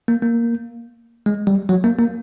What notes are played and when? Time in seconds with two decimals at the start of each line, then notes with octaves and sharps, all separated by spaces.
0.08 A#3
0.23 A#3
1.26 G#3
1.47 G3
1.69 F#3
1.84 A#3
1.99 A#3